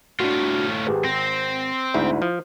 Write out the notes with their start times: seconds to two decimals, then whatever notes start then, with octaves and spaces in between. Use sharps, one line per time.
0.20 A2 D4 F4 F#4
0.87 G#1 G4 G#4 B4
1.05 C4 A#6
1.94 D2 G#2 E4
2.22 F3